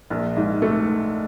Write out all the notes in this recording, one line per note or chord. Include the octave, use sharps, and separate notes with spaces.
A#1
G#2
A3